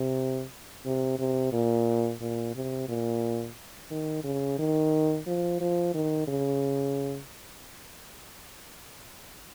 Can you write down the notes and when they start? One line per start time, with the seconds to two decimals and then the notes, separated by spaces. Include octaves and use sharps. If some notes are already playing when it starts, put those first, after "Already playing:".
Already playing: C3
0.85 C3
1.19 C3
1.53 A#2
2.21 A#2
2.55 C3
2.88 A#2
3.91 D#3
4.24 C#3
4.59 D#3
5.27 F3
5.60 F3
5.94 D#3
6.28 C#3